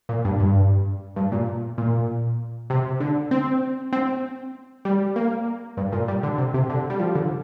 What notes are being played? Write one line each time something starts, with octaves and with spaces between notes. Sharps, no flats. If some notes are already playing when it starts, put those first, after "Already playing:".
A#2
G2
G2
G2
A#2
A#2
C3
D3
C4
C4
G3
A#3
G2
A#2
G3
D3
C3
C3
D3
G3
F3
D3